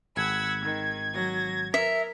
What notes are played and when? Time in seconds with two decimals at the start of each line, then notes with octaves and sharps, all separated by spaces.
0.17 G#1 F#5 B5 E6 G#6
0.62 D#3
1.13 F#3 A#6
1.74 A#4 E5